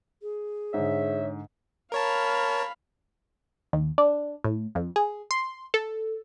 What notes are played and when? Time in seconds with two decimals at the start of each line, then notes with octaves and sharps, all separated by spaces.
0.22 G#4
0.74 G#2 D3 C#5 E5
1.92 A#4 C#5 F5 A5 B5
3.73 D#2
3.98 D4
4.44 A2
4.75 F2
4.96 G#4
5.31 C6
5.74 A4